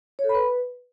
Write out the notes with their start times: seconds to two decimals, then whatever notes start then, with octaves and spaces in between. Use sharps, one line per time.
0.19 C#5
0.24 A4
0.29 B5
0.35 B4